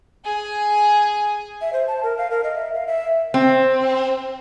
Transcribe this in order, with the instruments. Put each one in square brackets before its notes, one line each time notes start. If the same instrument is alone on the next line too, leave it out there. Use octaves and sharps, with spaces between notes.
[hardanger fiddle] G#4 G#5
[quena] E5
C5
A5
A#4
F5
A#4
D#5
E5
F5
E5
[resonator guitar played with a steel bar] C4